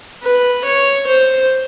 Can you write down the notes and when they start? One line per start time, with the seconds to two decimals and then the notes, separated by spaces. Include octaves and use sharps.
0.23 B4
0.65 C#5
1.07 C5